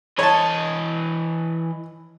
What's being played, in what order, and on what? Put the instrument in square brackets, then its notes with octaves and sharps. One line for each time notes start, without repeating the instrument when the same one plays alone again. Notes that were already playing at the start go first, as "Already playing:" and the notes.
[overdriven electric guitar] E3 D#5 [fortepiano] C#5 A5